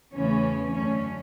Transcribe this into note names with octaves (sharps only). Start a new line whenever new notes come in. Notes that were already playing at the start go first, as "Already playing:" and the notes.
E2 C#3 E3 A3 C#4
F#2 D3 A3 C#4